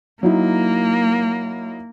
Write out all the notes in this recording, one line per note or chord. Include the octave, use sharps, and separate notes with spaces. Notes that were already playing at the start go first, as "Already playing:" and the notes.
F#3 A#3 D#4 E4